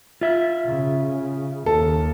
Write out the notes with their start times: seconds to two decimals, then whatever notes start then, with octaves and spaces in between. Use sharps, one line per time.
0.21 F4 E5
0.63 C#3
1.66 D#2 A4